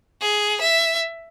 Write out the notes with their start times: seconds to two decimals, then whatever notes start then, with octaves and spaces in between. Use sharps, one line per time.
0.21 G#4
0.61 E5